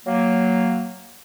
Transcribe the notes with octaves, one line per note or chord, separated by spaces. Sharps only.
F#3 A#3